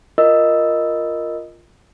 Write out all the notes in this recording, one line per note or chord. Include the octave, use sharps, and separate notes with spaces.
F4 A#4 D#5 E6